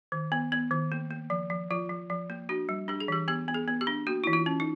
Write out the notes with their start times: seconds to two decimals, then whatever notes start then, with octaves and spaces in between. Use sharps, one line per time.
0.12 D#3
0.32 B3
0.52 B3
0.71 D#3
0.92 A#3
1.11 A#3
1.30 F3
1.50 F3
1.70 F3 F4
1.89 F3
2.10 F3
2.30 A#3
2.49 D4 F#4
2.69 G3
2.88 D4 G4
3.00 G#4
3.08 E3 G4
3.28 B3 G4
3.48 B3
3.54 G#4
3.68 B3
3.81 G4
3.87 D4
4.07 A#3 F#4
4.24 E3 E4
4.33 F4
4.46 C#4
4.60 D#4